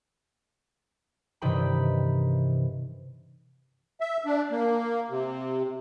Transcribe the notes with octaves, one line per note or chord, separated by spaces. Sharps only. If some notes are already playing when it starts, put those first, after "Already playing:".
G2 C3 D#3 E3 G5 B5
E5
D4
A#3
C3